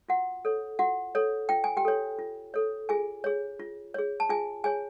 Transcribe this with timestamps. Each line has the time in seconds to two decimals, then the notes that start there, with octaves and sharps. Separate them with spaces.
0.08 F4 F#4 F#5
0.45 A4 C#5
0.79 F4 F#4 F#5
1.15 A4 C#5
1.49 F4 G5
1.64 G#5
1.77 G4 G5
1.85 A4 C#5
2.19 F4
2.54 A4 C#5
2.89 F4 G#4 G#5
3.24 G#4 C#5
3.60 F4
3.94 G#4 C#5
4.20 A5
4.29 F4 G#4 G#5
4.64 G#4 C#5 G#5